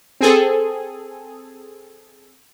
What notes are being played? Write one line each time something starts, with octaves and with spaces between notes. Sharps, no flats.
C4 G#4 A4